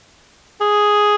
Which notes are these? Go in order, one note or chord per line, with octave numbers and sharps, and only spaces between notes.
G#4